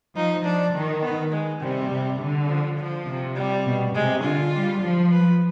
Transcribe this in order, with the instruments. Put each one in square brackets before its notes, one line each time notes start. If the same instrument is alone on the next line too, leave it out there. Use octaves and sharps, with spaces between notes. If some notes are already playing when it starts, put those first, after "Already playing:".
[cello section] F3 [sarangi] D#4
[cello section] F3 [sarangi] D4
[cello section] D#3
[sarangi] B3
G#3
[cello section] C3 [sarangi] G3
[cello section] C3
D3
[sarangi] F3
F3
[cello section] C3
[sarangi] G3
[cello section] B2
[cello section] C3 [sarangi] G#3
[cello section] D3 [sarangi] F4
[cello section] G3
F3
[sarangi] B4